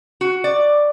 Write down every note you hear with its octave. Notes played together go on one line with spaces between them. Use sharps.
F#4
D5